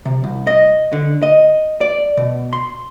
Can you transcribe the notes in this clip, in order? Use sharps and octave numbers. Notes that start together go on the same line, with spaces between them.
C3
C2
D#5
D3
D#5
D5
B2
C6